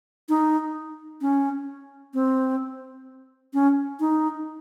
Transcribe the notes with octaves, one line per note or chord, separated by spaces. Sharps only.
D#4
C#4
C4
C#4
D#4